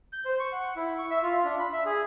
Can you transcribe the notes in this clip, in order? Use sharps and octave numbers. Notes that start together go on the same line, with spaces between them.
G6
C5
C#6
F#5
E4
C#6
E5
F4
D4
B5
E5
G#4